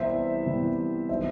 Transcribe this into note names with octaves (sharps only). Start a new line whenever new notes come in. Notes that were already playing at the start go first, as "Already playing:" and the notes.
Already playing: C2 C3 E3 G3 B3 C5 E5
C2 C3 E3 G3 B3
D#3 F#3 B3 D#4 C5 E5